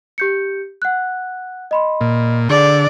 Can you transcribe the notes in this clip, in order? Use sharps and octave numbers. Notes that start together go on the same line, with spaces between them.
G4 G6 C#7
F#5 F#6
D#5 B5 C6
A#2
D3 G#4 D5